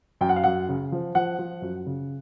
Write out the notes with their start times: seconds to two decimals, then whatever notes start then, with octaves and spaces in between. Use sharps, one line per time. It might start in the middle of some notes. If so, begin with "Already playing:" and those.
0.21 F#2 G5
0.29 F#5
0.36 F5
0.44 F#2 F#5
0.69 C#3
0.92 F3
1.15 F3 F#5
1.39 F3
1.62 F#2
1.86 C#3